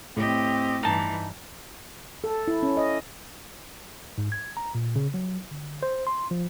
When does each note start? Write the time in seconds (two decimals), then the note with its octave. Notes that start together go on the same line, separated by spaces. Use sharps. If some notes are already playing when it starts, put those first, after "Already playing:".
0.16 A2 C4 G4 D#5
0.83 G2 E3 D#4 A5
2.24 A4
2.48 E4
2.63 C#4
2.77 D#5
4.18 G#2
4.32 G#6
4.57 A#5
4.75 A#2
4.96 C#3
5.14 F#3
5.51 D3
5.83 C5
6.07 C6
6.31 F3